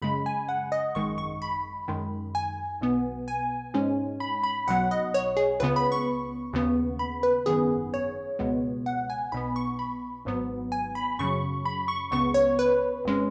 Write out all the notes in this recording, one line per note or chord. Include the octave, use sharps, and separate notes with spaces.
F#2 C#3 G#3 B5
G#5
F#5
D#5
G#1 F#2 D#3 G#3 C#6
C#6
B5
F#2 D#3 G#3
G#5
B1 B2 B3
G#5
G#2 G#3 C#4
B5
B5
B1 B2 F#3 F#5
D#5
C#5
G#4
C#2 C#3 B3 B4
B5
C#6
D#2 C#3 B3
B5
B4
G#1 F#2 D#3 B3 G#4
C#5
C#2 B2 G#3 B3
F#5
G#5
B1 B2 B3 B5
C#6
B5
G#1 G#2 F#3 B3
G#5
B5
F#2 C#3 F#3 C#6
B5
C#6
C#2 C#3 B3 C#6
C#5
B4
G#1 G#3 C#4